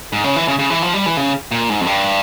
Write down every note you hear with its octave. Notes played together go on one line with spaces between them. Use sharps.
G#2
C#3
E3
C#3
C#3
E3
F3
G3
E3
C#3
A#2
G#2
F2
G2